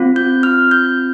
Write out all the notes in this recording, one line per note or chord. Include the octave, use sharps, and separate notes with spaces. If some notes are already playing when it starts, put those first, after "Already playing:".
Already playing: C4 F4
G6
F6
G6